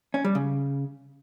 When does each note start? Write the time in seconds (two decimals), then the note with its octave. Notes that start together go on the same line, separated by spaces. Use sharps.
0.14 C#4
0.24 G3
0.35 C#3